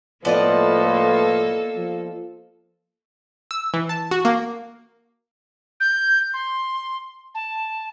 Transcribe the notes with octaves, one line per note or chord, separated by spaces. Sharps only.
A2 F3 A#3 B3 A4 B4 D5 D#5
F3
E6
E3
A5
F#4
A#3
G6
C6
A5